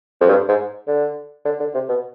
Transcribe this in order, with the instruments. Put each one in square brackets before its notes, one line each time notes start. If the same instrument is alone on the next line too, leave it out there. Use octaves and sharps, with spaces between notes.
[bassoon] F2
G2
G#2
D3
D3
D3
C3
B2